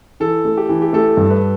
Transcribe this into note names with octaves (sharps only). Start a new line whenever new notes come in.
E3 A4
A3
G4
E3
G4
A3 A4
G2
B4